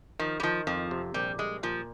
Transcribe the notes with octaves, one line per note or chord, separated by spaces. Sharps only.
D#3 F3
G3
D#3 F3
F2 F3
C3
A#1 G3
G3 G#3
A#2 F3